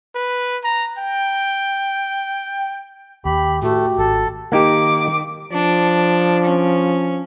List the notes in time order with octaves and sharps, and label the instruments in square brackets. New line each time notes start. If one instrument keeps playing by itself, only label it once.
[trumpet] B4
A#5
G5
[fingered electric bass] D#2 [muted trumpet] G4 [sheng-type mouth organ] B5
[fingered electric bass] A2 [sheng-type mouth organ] A3 [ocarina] F#4 [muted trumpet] G4
[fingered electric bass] G#1 [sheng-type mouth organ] A4
[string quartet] D#3 D6 [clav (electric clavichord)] A#3 D#4 G4
[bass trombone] F3 [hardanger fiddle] D4
[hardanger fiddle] C#4